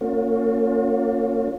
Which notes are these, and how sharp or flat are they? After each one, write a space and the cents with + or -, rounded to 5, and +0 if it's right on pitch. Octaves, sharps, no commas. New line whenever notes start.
A#3 -30 C#4 +0 F4 +40